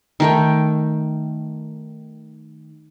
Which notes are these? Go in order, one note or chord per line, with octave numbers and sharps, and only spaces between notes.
D#3 A3 G5